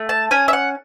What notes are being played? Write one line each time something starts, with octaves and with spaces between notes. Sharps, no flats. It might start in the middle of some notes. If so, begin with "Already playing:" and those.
Already playing: A3
A5
C#4 G#5
E5
F#5